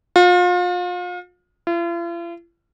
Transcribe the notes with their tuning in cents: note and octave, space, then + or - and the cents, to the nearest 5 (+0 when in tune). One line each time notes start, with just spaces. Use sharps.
F4 +35
F4 -45